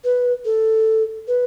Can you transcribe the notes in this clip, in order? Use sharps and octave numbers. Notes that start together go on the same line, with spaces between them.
B4
A4
B4